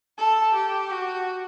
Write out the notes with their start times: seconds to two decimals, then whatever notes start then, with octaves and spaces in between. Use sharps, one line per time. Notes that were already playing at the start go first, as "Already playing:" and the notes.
0.18 A4
0.54 G4
0.91 F#4